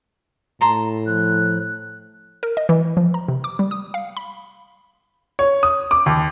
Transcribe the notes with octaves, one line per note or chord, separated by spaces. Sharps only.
A2 A5 A#5 C6
F3 F#6
A#4
D#5
E3
F3
A#5
C3
D6
G3
D#6
F5
B5
C#5
D#6
D6
D#2